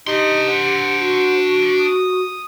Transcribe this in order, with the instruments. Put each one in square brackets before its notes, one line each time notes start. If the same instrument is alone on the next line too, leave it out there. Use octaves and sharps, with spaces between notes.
[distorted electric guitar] D4 C6 [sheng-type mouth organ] D#4 [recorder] G4
[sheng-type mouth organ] C5 F#5
[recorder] F#4
[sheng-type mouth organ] D#6